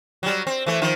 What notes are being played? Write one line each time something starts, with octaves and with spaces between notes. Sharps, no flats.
F#3 G3
C4
E3 A3
D#3 F3